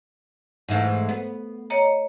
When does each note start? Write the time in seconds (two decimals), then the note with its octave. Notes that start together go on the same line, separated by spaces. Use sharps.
0.68 G#2 E3 A3
1.09 B3
1.70 C#5 D#5 A#5